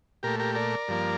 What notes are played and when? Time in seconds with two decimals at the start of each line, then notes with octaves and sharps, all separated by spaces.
0.23 A#2 A3 G4 A#4
0.39 G4 A#4
0.55 A#4 D5
0.88 G2 F3 A#3